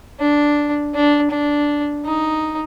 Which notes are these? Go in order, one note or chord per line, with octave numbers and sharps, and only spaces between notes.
D4
D4
D4
D#4